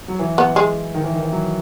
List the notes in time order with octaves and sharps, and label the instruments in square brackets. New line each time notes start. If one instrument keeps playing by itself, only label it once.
[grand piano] F#3
E3
[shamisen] B3
G#3
[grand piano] D#3
E3
D#3
E3
F#3